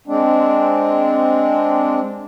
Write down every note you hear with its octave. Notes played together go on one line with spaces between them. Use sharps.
G#3 C4 D4